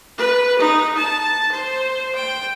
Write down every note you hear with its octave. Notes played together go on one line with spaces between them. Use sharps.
B4
D#4
A5
C5
G5